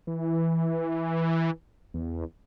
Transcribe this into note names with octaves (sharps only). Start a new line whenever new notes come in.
E3
E2